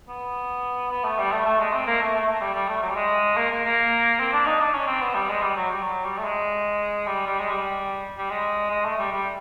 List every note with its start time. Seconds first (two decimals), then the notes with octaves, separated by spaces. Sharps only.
0.09 B3
0.91 B3
1.04 A3
1.19 G3
1.32 A3
1.46 A3
1.60 G#3
1.73 C4
1.86 A#3
2.01 A3
2.14 A3
2.28 A3
2.41 G3
2.54 G3
2.68 A3
2.83 F#3
2.90 G3
2.96 G#3
3.37 A#3
3.51 A#3
3.65 A#3
4.20 C4
4.33 D4
4.46 D#4
4.60 D4
4.74 C#4
4.87 C4
5.02 B3
5.15 G3
5.29 G#3
5.42 G3
5.56 F#3
5.70 G3
5.83 F#3
6.04 G3
6.18 A3
6.25 G#3
7.07 G3
7.27 G3
7.39 G#3
7.49 G3
8.17 G3
8.30 G#3
8.70 G#3
8.85 A3
8.99 G3
9.12 G3